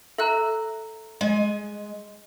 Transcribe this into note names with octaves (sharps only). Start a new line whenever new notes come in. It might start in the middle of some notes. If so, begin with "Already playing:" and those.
A4 E5 A#5 E6 F#6
G#3 D#5 G#5